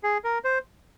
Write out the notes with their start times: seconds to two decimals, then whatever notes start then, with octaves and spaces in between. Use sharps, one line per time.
0.03 G#4
0.24 A#4
0.44 C5